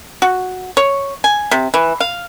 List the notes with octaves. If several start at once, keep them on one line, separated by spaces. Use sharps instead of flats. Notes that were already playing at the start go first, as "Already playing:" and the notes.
F#4
C#5
G#5
C3
E3
F5